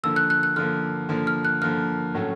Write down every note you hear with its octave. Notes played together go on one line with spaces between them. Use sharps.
D3 F3 A#3 E6
F#6
F#6
F#6
D3 F3 A#3 F6
D3 F3 A#3
F6
F#6
D3 F3 A#3 F6
A2 F#3 A3 C#4